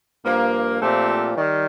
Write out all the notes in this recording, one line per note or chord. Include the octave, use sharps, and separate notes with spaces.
G2 F3 A#3
A#2 F3 A3 C4 G4
D#3 G3